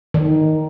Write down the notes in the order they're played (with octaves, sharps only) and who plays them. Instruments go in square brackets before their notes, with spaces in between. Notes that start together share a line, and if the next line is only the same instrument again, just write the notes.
[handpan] D#3